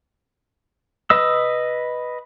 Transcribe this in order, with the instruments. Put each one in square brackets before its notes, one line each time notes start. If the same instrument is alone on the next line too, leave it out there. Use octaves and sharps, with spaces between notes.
[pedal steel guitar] B4 D#5 E6